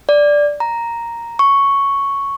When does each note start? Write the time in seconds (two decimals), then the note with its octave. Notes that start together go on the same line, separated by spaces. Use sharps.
0.09 D5
0.60 A#5
1.39 C#6